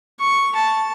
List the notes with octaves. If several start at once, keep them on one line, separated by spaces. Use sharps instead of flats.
C#6
A5